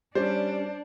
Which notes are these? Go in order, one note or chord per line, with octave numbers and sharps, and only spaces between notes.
G3 C#4 D4 C5 D5